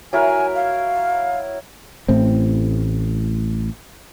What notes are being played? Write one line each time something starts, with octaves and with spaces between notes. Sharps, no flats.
F#3 E4 A#4 G#5
F5
A1 A2 C4